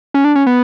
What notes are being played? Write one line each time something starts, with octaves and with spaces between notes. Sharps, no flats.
C#4
D4
C#4
B3